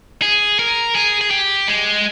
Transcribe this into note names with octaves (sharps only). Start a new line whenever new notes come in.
G#4
A#4
G#4
G#4
G4
G#3